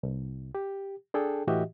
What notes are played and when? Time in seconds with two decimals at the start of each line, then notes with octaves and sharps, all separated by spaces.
0.03 C2
0.55 G4
1.14 D4 G#4 A4 G5
1.47 A2 E3 F#4 G4 D#5 E5